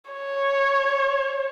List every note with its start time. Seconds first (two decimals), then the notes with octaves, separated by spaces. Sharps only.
0.11 C#5